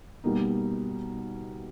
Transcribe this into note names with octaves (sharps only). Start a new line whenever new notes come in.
B2 G3 A#3 D#4